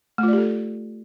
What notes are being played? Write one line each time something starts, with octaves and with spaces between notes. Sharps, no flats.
A3 F4 G4 A4 D5